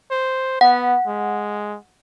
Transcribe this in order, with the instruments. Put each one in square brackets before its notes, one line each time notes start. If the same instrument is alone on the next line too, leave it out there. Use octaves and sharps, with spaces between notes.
[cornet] C5
[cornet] B3 [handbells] F#5
[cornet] G#3